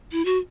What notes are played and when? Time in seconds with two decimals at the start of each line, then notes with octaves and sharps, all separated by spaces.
0.12 E4
0.25 F#4